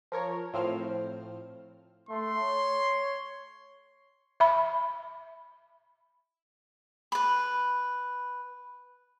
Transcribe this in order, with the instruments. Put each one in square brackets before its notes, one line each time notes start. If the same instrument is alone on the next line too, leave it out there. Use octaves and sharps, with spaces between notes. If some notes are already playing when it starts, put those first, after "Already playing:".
[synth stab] F3 A#4 C#5
A2 F3 C4 C5 F6
[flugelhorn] A3 [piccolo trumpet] C6
[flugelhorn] C#5
[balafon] E5 B5
[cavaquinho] B4 B5